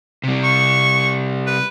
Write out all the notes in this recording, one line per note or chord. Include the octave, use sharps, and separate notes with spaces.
C3 G3
C#6
B4